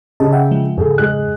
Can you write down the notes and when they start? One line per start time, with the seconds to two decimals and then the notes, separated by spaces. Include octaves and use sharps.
0.20 C#3 G4 D#5 A5
0.32 E5 F#5 G5
0.51 F3 G#3
0.78 F2 G#2 C#3 G#4 A4
0.98 G#3 G#4 F#6